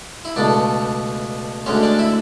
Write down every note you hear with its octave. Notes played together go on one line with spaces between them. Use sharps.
E4
C#2 B2 A3 D4
D2 D3 G#3 C#4 C#5
D4 D5
E4 E5